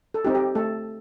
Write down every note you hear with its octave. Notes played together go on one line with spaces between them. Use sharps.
A4
C4 D#4 G4
G4
A3 A4